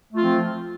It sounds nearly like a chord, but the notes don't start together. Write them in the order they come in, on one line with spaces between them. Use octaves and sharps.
A3 F4 C4 F3